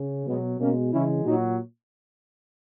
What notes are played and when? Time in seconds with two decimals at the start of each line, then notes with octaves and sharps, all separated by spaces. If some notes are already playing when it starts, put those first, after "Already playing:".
Already playing: C#3
0.26 B2 F#3 G#3 B3
0.60 B2 G#3 A#3 C#4
0.93 C#3 E3 G#3 C#4 E4
1.25 A#2 F#3 D#4 F#4